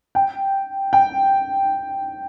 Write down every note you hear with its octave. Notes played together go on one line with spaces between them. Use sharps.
G5
G5